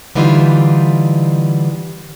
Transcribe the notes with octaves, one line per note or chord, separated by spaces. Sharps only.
D3 E3 G3 D#4 F4